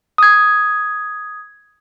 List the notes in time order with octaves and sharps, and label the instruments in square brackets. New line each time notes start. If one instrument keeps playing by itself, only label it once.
[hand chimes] D#6 G#6